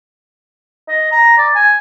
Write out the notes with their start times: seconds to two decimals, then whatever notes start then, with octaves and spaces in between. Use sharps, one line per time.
0.88 D#5
1.11 A#5
1.38 D5
1.55 G#5